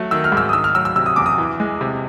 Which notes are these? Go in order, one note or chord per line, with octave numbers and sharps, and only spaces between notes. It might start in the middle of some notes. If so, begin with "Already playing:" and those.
Already playing: F#3 A3
D#3 E6
F6
G#2 E6
D#6
D#3 E6
F6
F#3 E6
E6
C3 E6
D#6
E2 D6
D#6
E3
G#3
C3